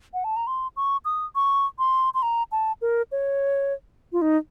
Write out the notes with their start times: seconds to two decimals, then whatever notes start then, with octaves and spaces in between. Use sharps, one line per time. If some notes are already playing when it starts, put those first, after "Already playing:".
0.14 F#5
0.24 A5
0.36 A#5
0.47 C6
0.77 C#6
1.05 D#6
1.35 C#6
1.79 C6
2.14 C6
2.22 A#5
2.52 A5
2.82 A#4
3.12 C#5
4.12 F4
4.22 D#4